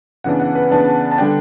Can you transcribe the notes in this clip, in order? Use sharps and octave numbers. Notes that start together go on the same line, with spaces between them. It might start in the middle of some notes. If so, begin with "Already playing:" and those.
C#3 E3 B3 D4 F#5
F#5
B4
C#3 E3 B3 D4 A5
A5
D3 G3 D4 G5